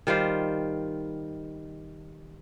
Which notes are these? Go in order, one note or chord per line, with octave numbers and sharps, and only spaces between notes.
D#3 G3 F4 C5